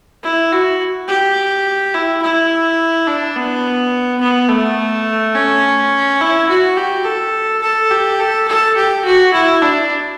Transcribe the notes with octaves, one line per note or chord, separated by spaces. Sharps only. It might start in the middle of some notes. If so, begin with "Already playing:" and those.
E4
F#4
G4
E4
E4
D4
B3
B3
A3
C#4
E4
F#4
G4
A4
A4
G4
A4
A4
G4
F#4
E4
D4